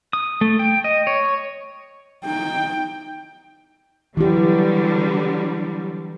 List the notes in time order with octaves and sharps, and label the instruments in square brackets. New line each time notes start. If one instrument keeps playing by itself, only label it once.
[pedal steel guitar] D#6
A3
G5
D#5
C#5
[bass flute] D#4 [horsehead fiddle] G5
[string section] D3 F#3 G3 [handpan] E3 G4